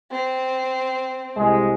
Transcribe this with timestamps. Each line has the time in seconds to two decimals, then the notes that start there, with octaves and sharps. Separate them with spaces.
0.11 C4
1.37 C2 G#3